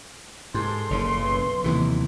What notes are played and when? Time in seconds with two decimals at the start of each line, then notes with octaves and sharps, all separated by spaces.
0.54 G#2 G4 A4 C6
0.90 F#1 C#3
1.17 B1
1.64 D#2 C3 E3